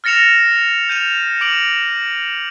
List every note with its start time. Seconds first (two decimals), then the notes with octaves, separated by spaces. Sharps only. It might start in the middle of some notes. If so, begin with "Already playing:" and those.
0.04 F6 A6 A#6 C#7 E7 F7
0.89 G6 D#7 F7
1.41 D6 D7 F#7